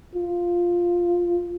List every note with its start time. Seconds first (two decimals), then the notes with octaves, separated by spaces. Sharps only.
0.15 F4